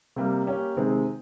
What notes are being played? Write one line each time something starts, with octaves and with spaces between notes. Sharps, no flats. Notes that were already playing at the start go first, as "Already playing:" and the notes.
C3 G3 A#3
A#3 C#4 G4
C3 D#3 G#3 C4